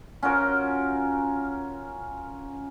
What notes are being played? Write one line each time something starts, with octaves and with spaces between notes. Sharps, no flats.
C#4 F4 F#4 A#4